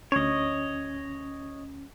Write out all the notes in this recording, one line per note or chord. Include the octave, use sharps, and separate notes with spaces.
D2 C#4 C#5 D#5